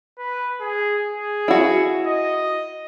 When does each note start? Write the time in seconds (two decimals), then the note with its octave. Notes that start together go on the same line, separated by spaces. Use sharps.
0.19 B4
0.61 G#4
1.10 G#4
1.48 E4 F#4
2.07 D#5